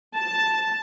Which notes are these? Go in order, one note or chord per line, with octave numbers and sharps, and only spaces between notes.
A5